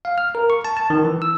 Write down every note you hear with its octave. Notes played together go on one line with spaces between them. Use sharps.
F5
F6
A#4
C#6
A5
A5
D#3
E3
E6